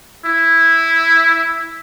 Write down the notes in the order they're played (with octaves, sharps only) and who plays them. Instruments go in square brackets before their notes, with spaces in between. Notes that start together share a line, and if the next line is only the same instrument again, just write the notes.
[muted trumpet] E4